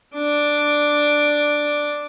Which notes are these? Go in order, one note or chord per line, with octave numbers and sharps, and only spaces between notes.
D4 D6